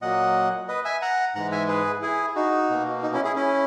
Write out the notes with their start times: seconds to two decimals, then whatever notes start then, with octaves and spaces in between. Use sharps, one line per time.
0.02 A#2 F#3 A#3 D#5 F#5
0.68 B4 D#5
0.85 E5 G#5
1.02 F#5 A#5
1.35 G#2 E3 G#3 F#5 A#5
1.52 E5 G#5
1.68 G#4 B4
2.02 E4 G#4
2.36 D#4 F#4
2.70 B2 A#3
3.03 D#4
3.13 C#4 E4
3.24 E4 G#4
3.36 C#4 E4